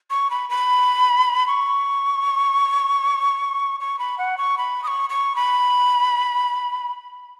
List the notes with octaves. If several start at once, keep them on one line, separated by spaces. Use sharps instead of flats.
C#6
B5
B5
C#6
C#6
B5
F#5
C#6
B5
D#6
C#6
C#6
B5